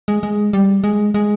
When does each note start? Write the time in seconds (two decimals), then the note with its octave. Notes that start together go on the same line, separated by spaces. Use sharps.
0.08 G#3
0.23 G#3
0.53 G3
0.84 G#3
1.14 G#3